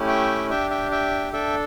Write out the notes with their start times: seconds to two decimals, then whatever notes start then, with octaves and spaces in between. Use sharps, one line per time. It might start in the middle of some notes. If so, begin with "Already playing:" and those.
Already playing: A3 C#4 E4 G4
0.08 E5 G5
0.49 D4 G4 E5 G5
0.70 E5 G5
0.91 E5 G5
1.33 D4 A4 E5 G5